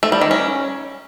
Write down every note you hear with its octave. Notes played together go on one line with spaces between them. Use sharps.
A3
G3
D#3
C#4